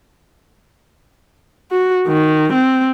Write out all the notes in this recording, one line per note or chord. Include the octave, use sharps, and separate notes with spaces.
F#4
D#3
C4